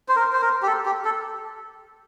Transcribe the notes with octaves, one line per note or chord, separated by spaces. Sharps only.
C5
A#4
C5
A#4
G4
A4
G4
A4